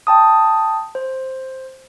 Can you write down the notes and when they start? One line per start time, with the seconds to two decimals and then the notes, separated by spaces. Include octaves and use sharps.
0.07 G5 A5 D#6
0.95 C5